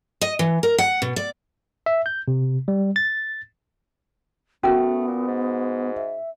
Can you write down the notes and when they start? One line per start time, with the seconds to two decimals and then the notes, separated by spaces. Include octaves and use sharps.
0.21 D#5
0.39 E3
0.63 A#4
0.78 F#5
1.02 B2
1.16 D5
1.86 E5
2.06 G6
2.28 C3
2.68 G3
2.96 A6
4.63 A3 B3 C#4 F#4 A#4
5.07 A#2
5.28 G#2
5.96 E5